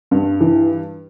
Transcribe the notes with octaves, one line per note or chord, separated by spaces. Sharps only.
G2
E3